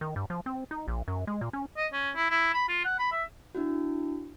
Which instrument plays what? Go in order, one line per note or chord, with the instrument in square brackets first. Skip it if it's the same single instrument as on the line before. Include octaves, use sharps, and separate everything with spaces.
[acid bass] D#3
G2
F3
C4
D#4
A#1
F#2
G#3
A#2
C#4
[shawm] D#5
C#4
E4
E4
B5
F4
F#5
B5
E5
[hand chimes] D4 E4 F#4